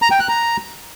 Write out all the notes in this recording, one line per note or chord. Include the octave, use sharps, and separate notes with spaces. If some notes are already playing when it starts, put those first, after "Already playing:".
A#5
G5
F#6
A#5